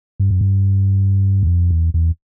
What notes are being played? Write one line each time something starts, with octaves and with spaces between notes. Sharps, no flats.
G2
F#2
G2
E2
F2
E2
E2